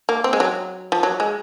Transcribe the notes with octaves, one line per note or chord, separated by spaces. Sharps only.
A#3
C4
G#3
F#3
F3
F#3
G#3